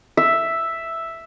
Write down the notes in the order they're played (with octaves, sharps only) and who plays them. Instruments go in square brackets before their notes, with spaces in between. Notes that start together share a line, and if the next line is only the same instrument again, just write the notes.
[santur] E5